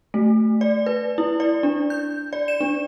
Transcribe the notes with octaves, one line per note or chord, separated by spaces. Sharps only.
A3
D5
B4
E4
D5
D4
G6
D5
E7
D4